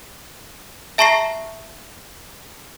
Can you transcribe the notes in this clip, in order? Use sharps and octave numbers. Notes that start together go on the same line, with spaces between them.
E5 A5 A#5 C#6 A#6 C7